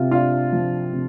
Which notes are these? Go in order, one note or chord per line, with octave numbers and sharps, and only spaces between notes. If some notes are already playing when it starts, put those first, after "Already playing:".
Already playing: C3 F4
D4 F4 F5
F3
C3